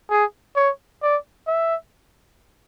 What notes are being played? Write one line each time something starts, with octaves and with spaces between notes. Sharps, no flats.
G#4
C#5
D5
E5